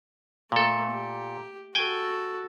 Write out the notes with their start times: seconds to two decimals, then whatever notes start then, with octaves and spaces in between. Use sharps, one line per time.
0.52 A#2 A3 A#3 A4
0.91 G4
1.75 F#4 A4 G5 G#5